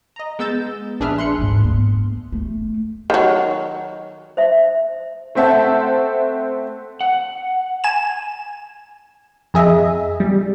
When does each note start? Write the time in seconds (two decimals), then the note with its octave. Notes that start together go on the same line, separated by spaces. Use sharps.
0.16 D#5 A#5
0.39 G#3 B3 E6 G6 A6 E7
1.00 A#1 D4 G#4 B4 E5 F6
1.18 C6 F#6 C#7
1.38 D2 G#2
1.64 B3
2.32 A3
3.10 D#3 F#3
4.37 C5 E5
5.35 A3 C4 C5 E5 F#5 A5
7.01 F#5
7.84 G#5 E7
9.54 F2 G#4 D#5 E5
10.20 G3